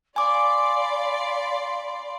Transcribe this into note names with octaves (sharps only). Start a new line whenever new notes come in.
D5 F5 G#5 B5 C6 D6